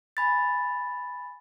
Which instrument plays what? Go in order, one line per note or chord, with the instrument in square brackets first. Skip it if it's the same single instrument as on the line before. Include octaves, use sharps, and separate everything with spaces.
[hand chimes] G#5 B5 A6